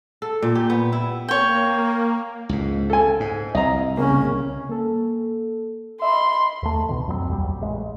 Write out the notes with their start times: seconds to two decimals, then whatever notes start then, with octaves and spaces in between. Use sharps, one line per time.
0.22 A4
0.42 A#2
0.55 G4
0.70 B3
0.92 E4
1.28 A#3 C#5 G5
2.49 C#2 G#2
2.90 A4 G#5
3.20 G#2
3.55 C2 D#5 A#5
3.97 C#3 A#3 C#4
4.69 A#3 A4
6.02 D#5 E5 B5 C6
6.63 D#2 A3
6.89 C#2 B2 D#3
7.07 F2 F#3 G#3 C4
7.28 A#1 D#2 G3
7.61 A1 A2 G#3